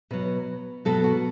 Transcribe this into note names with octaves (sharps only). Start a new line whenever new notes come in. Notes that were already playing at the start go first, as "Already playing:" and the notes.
B2 F#3 B4
B2 F#3 A4
F#4